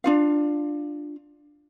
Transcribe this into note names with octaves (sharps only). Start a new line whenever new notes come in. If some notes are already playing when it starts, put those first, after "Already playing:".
D4 F4 F5